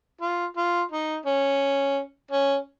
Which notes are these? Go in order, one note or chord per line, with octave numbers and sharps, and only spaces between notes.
F4
F4
D#4
C#4
C#4